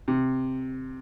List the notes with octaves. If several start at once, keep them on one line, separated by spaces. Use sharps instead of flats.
C3